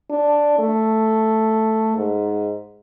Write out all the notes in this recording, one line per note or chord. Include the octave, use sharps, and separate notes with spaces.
D4
A3
G#2